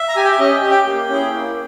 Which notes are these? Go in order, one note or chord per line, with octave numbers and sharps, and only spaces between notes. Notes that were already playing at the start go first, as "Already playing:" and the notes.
Already playing: E5
A#5
G4 G#5
G5
E5
C#4 D#5
G5
G4
G5
A#3
C#4 E4 G#4
A#3